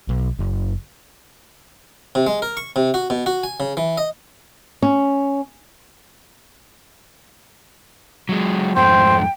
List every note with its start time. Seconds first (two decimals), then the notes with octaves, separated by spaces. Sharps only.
0.09 B1
0.39 F#1
2.15 C3
2.27 G#3
2.42 A#4
2.57 C#6
2.76 C3
2.94 F#4
3.10 B2
3.26 F#4
3.43 G#5
3.60 C#3
3.77 E3
3.98 D#5
4.82 C#4
8.29 F#3 G#3
8.76 F2 G#2 A3 C5 G5